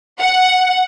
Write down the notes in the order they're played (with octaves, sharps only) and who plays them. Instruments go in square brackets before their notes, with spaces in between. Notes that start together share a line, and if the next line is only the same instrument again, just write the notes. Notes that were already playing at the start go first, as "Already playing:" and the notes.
[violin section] F#5